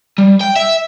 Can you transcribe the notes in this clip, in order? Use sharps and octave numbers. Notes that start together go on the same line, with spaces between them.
G3
G5
E5